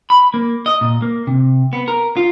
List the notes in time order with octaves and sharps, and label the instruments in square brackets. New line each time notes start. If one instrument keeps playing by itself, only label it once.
[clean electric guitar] B5
A#3
D#5
A#2
A#3
C3
B3
A#4
F4